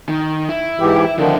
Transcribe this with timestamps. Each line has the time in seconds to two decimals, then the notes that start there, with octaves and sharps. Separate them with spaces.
0.09 D#3
0.49 E4
0.80 G#2 E3 G4
1.18 D3 D#3 F3 D4 E4